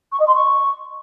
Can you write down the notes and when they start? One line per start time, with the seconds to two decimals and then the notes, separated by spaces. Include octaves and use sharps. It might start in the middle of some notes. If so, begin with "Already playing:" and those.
0.12 C#6
0.20 D#5
0.27 C6
0.35 C#6